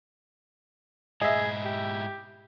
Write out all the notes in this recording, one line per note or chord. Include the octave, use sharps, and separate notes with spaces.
G#2 E4 G#4 D#5 E5
G4